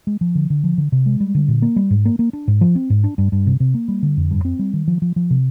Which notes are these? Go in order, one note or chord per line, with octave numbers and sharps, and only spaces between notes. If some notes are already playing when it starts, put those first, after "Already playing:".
G#3
F3
D3
D3
F3
D3
C3
G#3
G3
D3
A#2
A#3
G3
G#2
A#3
A#3
D4
G#2
F3
C4
G#2
D4
G2
G2
C3
C3
A#3
G3
D3
F2
G2
C4
G3
D#3
F3
F3
F3
C3